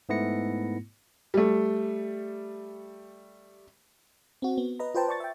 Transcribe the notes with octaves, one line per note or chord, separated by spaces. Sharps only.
G#2 A3 B3 E4 A#6 C#7
G3 A3
C4 F#4
B3
B4 D#5 A#5
F4 B4 C5 G5 A5
D5 A5 C#6 A6
E5 G5